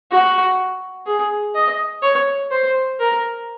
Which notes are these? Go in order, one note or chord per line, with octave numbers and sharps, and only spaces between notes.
F#4
G#4
D#5
C#5
C5
A#4